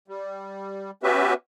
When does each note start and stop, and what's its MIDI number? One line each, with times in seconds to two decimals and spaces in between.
0.08 0.91 55
1.03 1.34 59
1.03 1.34 61
1.03 1.34 66
1.03 1.34 67
1.03 1.34 71
1.03 1.34 76